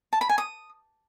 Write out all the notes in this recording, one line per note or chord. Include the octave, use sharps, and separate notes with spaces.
A5
B5
G#5
D#6